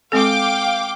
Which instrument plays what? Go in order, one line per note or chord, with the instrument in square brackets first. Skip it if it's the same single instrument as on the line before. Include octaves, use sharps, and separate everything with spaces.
[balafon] G#3 C4 A4 [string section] F5 G5 D6